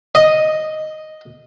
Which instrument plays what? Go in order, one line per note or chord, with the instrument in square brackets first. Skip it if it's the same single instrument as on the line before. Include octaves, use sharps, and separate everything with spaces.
[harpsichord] D#5